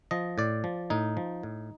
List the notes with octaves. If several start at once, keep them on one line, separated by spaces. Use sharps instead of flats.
F3 D#5
A2 D5
F3
A2 D#4
F3
A2